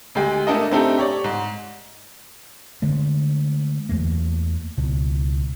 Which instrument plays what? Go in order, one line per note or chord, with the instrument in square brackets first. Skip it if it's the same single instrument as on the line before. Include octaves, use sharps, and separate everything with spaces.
[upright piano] D2 G#3 G4
A3 A#3 D4 A4 D#5
A3 C4 D4 D#4 G4 A4
G4 C#5 D5
G#2
[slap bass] D3 G#3 A3
E2 A3 A#3
C#2 B2